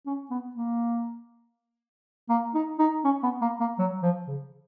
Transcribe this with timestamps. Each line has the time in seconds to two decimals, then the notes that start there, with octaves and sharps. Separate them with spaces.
0.07 C#4
0.31 B3
0.56 A#3
2.29 A#3
2.54 D#4
2.79 D#4
3.05 C#4
3.23 B3
3.41 A#3
3.60 A#3
3.79 F#3
4.03 F3
4.28 C#3